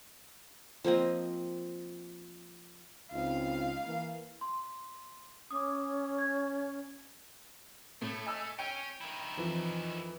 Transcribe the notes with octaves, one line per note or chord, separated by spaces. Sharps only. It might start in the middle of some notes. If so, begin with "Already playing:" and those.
F3 A#3 C4 D#5
C#2 C4 D#4 F5
E3 A#3
C6
C#4 D6 D#6
G#6
A2 A3
D#5 G#5 E6
C#4 G5
D#3 E4
F2 E3 F3